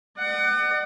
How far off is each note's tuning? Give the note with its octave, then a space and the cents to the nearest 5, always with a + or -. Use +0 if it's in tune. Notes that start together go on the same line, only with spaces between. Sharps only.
D5 +45 F#5 +25